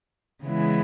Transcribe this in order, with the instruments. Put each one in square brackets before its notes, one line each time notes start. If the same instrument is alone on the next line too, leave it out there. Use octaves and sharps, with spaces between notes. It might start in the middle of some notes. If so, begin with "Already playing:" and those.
[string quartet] C#3 E3 G#3 B3 E4